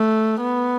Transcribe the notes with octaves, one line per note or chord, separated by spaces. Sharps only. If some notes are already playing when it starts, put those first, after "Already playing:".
Already playing: A3
B3